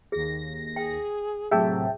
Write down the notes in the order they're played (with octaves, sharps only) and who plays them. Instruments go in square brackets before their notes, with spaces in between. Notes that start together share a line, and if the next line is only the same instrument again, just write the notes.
[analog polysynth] D#2 A#6 [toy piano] G#4
[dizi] G#4 [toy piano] G5
[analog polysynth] A2 C3 F#3 [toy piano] G#4 [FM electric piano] E5 G5 A5